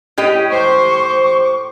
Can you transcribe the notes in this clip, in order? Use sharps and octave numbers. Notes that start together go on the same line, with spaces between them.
A2 G4 D#5
C5 C#6 D6